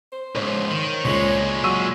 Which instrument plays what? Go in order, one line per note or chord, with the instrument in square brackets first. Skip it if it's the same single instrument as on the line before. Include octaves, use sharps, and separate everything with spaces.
[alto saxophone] C5
[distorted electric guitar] C#2 G#2 [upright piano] C#5
[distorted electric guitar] D#3
[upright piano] C#2 F#7 [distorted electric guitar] A#2 G#3 [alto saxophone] C#5
[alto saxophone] F#3 [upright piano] C#6 E6 D#7